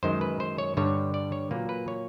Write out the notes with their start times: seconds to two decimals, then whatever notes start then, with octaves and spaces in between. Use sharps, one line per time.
0.03 F#2 D#3 G#3 C5
0.21 B4
0.40 C5
0.58 C#5
0.77 G2 D3 G3 C#5
1.14 D5
1.32 C#5
1.51 A#2 F#3 A#3 B4
1.69 B4
1.88 C#5